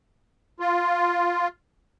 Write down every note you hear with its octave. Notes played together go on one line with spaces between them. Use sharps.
F4